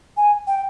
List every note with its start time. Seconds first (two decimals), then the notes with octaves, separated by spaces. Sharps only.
0.17 G#5
0.47 G5